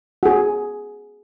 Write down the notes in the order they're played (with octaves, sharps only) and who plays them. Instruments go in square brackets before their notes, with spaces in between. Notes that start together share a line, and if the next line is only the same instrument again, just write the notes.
[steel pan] F#4 G#4